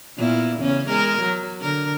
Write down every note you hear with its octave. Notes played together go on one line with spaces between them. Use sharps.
A#2 B3 E4
E2 C#3 C#4
G#3 A#4
F#3
D3 A#4